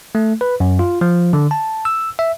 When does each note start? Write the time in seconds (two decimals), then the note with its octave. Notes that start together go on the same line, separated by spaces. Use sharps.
0.15 A3
0.41 B4
0.60 F#2
0.79 F4
1.01 F3
1.33 D3
1.51 A5
1.85 E6
2.19 E5